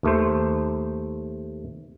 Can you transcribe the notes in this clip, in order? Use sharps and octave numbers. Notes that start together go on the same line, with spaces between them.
D#2 A3 C5